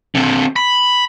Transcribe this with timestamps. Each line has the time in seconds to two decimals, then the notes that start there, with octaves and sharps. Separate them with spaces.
0.15 D3 C4
0.56 B5